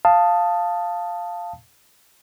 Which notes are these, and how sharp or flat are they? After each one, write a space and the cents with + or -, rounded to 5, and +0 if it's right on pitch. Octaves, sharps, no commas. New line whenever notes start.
F5 +0 A5 +5 D#6 +0